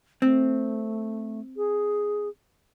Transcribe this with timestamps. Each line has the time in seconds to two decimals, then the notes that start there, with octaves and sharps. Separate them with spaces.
0.22 A3 C4
1.57 G#4